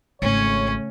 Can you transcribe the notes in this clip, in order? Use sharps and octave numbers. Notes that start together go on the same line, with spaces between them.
G#1 C#3 A3 C#4 C#5